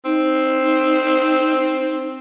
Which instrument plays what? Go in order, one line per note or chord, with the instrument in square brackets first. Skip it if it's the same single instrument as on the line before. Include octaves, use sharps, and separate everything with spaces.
[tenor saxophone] C4 [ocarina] D#4